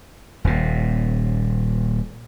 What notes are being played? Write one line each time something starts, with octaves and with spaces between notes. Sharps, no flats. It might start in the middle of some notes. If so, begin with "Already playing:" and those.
D#1 A#2